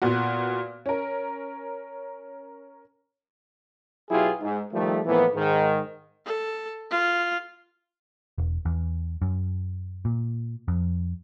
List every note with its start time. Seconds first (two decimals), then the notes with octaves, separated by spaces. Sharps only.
0.02 A#2 B3 F#4
0.86 C#4 A#4
4.11 B2 F#3 E4 F4 G4 G#4
4.42 G#2
4.74 D#3 F3 G3 A3
5.06 A2 E3 F3 A#3 B3
5.35 G#2 D#3
6.26 A4
6.91 F4
8.38 E1
8.65 E2
9.22 F#2
10.05 A#2
10.68 F2